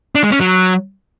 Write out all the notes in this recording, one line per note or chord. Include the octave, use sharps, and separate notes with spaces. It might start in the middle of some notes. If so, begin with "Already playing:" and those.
D4
G#3
C#4
F#3